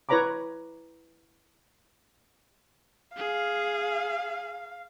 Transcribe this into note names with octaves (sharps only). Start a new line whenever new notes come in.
E4 B4 C#5 A#5 B5 D6
G#4 F5